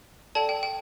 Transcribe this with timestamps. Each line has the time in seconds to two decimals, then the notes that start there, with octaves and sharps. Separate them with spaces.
0.35 A4 D5 G5 A5
0.49 G5
0.63 G5